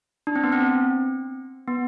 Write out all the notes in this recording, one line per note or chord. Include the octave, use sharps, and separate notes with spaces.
D4
C4
B3
C4
B3